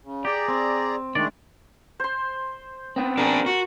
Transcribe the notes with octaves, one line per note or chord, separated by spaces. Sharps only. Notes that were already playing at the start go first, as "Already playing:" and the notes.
C#3
G4 G#4 D5 A#5
C4
D#3 G#3 A3 D4 D5
C5 C6
B3 C4
D4 G#4 A#4 A5
F#4